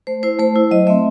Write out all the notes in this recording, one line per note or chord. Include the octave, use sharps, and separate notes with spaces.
A3 C5
E4 C5
A3 C5
E4
F#3 D#5
A3 C4 E5